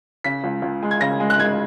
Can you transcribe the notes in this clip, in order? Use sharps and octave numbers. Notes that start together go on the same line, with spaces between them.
C#3 B6
C#2
C#2
G#3
G#6
C#3 A#6
G#3
F#6
G#3 G#6